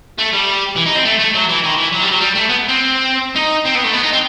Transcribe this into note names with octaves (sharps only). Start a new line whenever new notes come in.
A3
G3
E3
D#4
C4
A3
A3
F#3
E3
D#3
E3
F#3
G3
F#3
G3
A3
B3
C4
D#4
C4
B3
A3
B3
D#4
C4